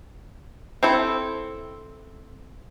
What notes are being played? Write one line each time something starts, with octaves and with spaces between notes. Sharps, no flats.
C4 E4 A4